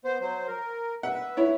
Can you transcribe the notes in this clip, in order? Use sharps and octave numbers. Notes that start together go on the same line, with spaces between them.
B3 C5
F#3 C5
A#4
B4 E5 F#5
E4 C#5